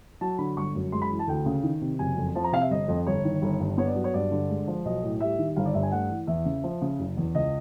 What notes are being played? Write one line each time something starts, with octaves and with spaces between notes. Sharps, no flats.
F#3 A5
D3 B5
G1 C#6
F#2
G#3 C6
B5
E3
A5
D2 G5
C#3
D#3
C3
F#1 G#5
F2
F3 A5
A#5
C3 F5
E5
G1 D#5
F2
G1 C#5
D#3
G1
G2
B3 C#5
D5
F#3
C#5
G2 D5
D3
G#3
F3
B1 D#5
A2
G3 E5
D#3
G1 F5
D5
G2 E5
G#5
A3 F#5
E3
E2 E5
C#3
F3
C#3
F#1
E2
C#2 D#5